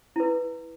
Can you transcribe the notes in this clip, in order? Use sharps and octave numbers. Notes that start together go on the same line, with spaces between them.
E4 B4